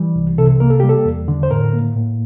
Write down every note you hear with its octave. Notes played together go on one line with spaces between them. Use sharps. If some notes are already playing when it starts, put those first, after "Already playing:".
Already playing: E3 G3
C2
C3 A4
A#3 A#4
A4
G3 G4
A4
E2
D3
C5
A2 A#4
A#3
A2